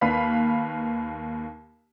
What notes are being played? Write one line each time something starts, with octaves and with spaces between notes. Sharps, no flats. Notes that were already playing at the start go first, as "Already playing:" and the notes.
D#2 A#3 B4 F5 B5 B6